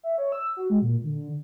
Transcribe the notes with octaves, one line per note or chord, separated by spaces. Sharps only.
E5
C#5
E6
F#4
G#3
A#2
D3